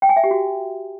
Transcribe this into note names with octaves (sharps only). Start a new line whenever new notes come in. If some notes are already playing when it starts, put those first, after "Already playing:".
G5
G#5
E5
G4
F#4